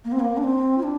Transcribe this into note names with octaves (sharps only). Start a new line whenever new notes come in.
A#3
C4
A#3
D4
C4
F4
D4